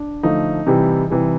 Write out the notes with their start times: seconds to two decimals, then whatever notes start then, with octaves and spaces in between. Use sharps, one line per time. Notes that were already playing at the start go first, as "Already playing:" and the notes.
Already playing: D4
0.23 D3 F3 A3 D#4
0.67 C3 E3 G3
1.10 C3 E3 G3